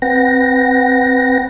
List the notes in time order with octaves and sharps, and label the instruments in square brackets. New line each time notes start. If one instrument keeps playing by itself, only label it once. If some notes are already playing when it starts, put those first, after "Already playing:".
[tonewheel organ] C4 B4 F#5 G5 A#6